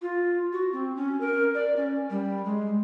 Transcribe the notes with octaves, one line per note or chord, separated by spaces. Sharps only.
F4
F#4
C4
C#4
A#4
D5
C#4
G3
G#3